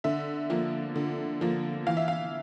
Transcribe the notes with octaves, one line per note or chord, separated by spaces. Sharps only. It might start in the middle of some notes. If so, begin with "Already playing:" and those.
D3 E5
F3 A#3
D3
F3 A#3
E3 F5
E5
F5